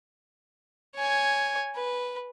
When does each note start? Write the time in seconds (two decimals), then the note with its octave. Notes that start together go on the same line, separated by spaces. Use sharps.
0.96 C#5 G#5
1.75 B4